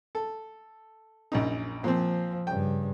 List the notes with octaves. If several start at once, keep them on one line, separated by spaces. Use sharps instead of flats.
A4
A#1 F#2 D#4
A#2 F3 C4
G2 C#3 G5